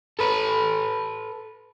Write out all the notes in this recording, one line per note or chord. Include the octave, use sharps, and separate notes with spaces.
A4 B4